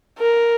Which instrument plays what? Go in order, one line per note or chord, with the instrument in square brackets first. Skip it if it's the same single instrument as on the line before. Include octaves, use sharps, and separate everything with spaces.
[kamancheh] A#4